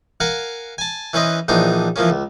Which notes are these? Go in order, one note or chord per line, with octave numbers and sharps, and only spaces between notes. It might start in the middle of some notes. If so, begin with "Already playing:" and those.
A#4 F5 F#5 G#5
G#5 A5
E3 C#4 B4 C5 D#5
A#1 E3 D4 D#4 C5
E3 F3 A#3 C#4
C#2